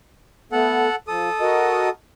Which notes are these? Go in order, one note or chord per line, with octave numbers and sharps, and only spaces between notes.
A3 B3 A4 F#5
F3 A4 D#6
F#4 A#4 D#5